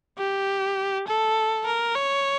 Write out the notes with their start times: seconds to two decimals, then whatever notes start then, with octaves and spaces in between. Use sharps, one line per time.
0.18 G4
1.07 A4
1.66 A#4
1.95 C#5